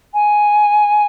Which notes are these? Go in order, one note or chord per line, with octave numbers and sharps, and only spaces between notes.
G#5